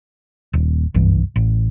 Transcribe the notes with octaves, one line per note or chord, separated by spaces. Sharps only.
D#1
F#1 C2 G2 E3
A1